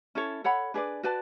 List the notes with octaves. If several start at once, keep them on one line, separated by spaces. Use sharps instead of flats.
C#4 E4 A4 C#5
A4 C#5 F#5 B5
D4 G#4 B4 D5
F#4 B4 D5 A5